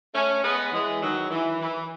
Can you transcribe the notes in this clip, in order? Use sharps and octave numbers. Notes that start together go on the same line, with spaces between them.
A3 C#4
G#3 B3
E3 G#3
D#3 F#3
E3
E3